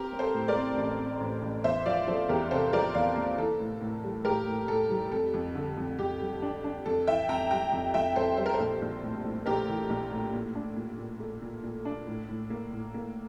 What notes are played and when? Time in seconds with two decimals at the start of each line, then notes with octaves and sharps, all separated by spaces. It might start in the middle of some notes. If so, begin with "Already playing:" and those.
Already playing: C4 G4 A#4
0.13 C4
0.19 A4 C5
0.34 A2
0.48 A#4 D5
0.55 C4
0.77 A1
0.99 C4
1.20 A1
1.42 A1
1.64 E2 C5 E5
1.86 F3 D5 F5
2.07 F3 A4 C5
2.29 E2 G4 A#4
2.51 C3 A4 C5
2.73 F3 A#4 D5
2.94 E2 D5 F5
3.16 A#3
3.38 E3 A4
3.60 A2
3.81 A2
4.04 G3
4.25 A2 G4 A#4
4.47 A2
4.68 A2 A4
4.90 G3
5.12 F2 A4
5.34 F2
5.55 D3
5.77 F2
5.99 F2 G4
6.20 G3
6.42 D4
6.64 D4
6.86 F2 A4
7.07 E3 E5 G5
7.29 F2 G5 A#5
7.51 G3 G5 A#5
7.73 F2
7.94 F2 E5 G5
8.16 F2 A4 C5
8.37 G3 C5
8.46 A#4
8.54 A4 C5
8.60 A#1
8.82 A#1
9.03 A2
9.25 A2
9.46 A#1 G4 A#4
9.68 E3
9.90 A#1
10.11 A2
10.33 A#2
10.55 D4
10.77 A#2
10.99 A#2
11.20 A3
11.42 A#2
11.63 A#2
11.85 D4
12.07 A2
12.29 A2
12.50 A#3
12.72 A2
12.94 A#3